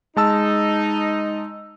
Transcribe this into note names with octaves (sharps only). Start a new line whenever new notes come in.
G#3 D#4 A5 E6